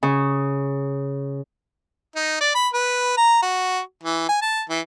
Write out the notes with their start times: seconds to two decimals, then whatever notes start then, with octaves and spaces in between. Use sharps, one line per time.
0.03 C#3
2.15 D#4
2.40 D5
2.55 B5
2.73 B4
3.17 A#5
3.42 F#4
4.04 E3
4.29 G#5
4.42 A5
4.70 E3